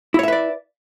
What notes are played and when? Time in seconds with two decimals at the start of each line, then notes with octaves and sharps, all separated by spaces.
0.14 E4
0.19 C#5
0.23 E5
0.28 B4
0.32 D5